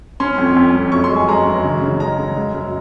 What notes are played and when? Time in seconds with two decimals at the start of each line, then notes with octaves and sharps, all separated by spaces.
0.20 C#4 C6
0.38 F2
0.56 F2
0.75 F2
0.92 F#2 C#6
1.04 C6
1.11 G#3
1.16 G#5
1.28 G#3 A#5
1.46 F#2
1.64 C#3
1.82 C#3
2.00 G#3 A#5
2.19 C#3
2.36 G#3
2.54 F#2